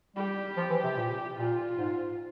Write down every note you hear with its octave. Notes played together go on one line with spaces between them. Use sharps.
G3 G4
F3
E3
C3
A#2
A#2 F4
G#2